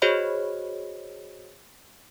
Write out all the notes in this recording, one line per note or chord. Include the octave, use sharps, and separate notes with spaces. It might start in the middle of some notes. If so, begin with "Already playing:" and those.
F#4 G#4 C5 C#5 D#5 B5